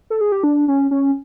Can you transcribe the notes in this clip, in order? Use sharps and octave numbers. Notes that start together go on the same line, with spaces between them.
A4
G#4
G4
D4
C#4
C#4